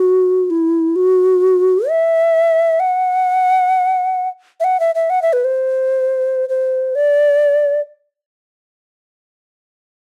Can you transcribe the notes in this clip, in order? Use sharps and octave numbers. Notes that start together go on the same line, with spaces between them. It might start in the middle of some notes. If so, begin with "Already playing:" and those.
Already playing: F#4
E4
F#4
E5
F#5
E5
F#5
E5
E5
F#5
E5
B4
C5
C5
D5